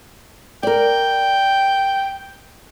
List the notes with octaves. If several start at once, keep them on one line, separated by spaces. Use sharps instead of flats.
A#4 D5 G5